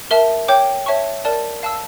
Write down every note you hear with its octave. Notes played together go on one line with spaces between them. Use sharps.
A#4 E5 A5
C#5 G5 D6 G6
C#5 E5 A5 C#6
A#4 D5 A5
F5 A5 E6